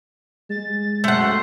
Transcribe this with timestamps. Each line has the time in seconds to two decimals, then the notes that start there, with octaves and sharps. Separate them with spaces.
0.50 G#3 A6
1.04 F#2 A3 F#5 C6